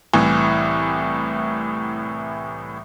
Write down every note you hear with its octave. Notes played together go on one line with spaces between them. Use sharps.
C2 A2 E3